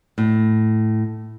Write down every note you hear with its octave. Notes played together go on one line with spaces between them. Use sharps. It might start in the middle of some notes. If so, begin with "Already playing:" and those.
A2